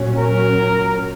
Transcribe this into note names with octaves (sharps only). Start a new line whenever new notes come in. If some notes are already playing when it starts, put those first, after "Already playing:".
Already playing: A#2 F#3 C#4
A#4